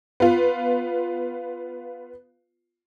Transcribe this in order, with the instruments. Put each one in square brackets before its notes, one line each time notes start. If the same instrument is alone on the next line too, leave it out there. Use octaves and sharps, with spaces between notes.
[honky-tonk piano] B3 F4